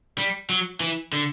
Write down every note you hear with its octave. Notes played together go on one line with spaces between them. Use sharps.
G3
F#3
E3
D3